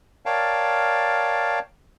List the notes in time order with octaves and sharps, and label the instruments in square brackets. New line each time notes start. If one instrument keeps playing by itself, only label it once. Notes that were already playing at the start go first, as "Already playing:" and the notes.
[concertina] A#4 C#5 D5 F5 G5 A5